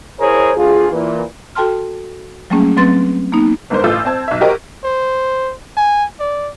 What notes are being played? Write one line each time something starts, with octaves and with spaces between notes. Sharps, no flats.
E4 G#4 A#4 C5 C#5
D2 F4 G#4
A#2 E3
F#4 A4 G5 A5 C6 F6
F#3 G3 A3 A#3 C#4 G#4
F#3 A3 C4 B4 C6 A6
A#3 B3 D#4
G1 G#2 A#4 C5
A1 F4 A4 E6 G6
C4 A5 G#6
B1 E5
F#4 G4 A#4 C5 D#5
C5
G#5
D5